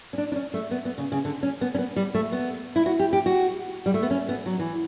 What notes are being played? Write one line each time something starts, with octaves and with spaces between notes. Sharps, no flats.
C#4
D4
D4
C#4
A3
B3
B3
C#3
C#3
D3
C#4
B3
C#4
B3
G3
A3
B3
E4
F#4
G4
G4
F#4
G3
A3
B3
C#4
B3
F#3
E3